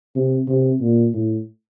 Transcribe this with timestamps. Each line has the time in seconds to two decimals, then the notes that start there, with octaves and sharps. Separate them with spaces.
0.15 C3
0.48 C3
0.80 A#2
1.14 A2